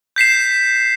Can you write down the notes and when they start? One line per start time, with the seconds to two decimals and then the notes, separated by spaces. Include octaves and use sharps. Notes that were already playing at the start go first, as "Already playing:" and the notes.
0.16 G6 B6 C7 E7